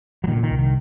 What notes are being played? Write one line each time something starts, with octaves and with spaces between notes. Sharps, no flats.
F#3
A#2 D#3
D3
D#3
C2
D#3